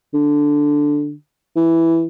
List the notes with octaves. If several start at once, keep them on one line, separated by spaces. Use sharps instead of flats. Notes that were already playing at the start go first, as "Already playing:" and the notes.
D3
E3